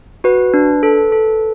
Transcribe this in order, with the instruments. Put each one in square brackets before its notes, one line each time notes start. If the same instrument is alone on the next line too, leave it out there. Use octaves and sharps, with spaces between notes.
[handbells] F#4 B4
D4
A4
A4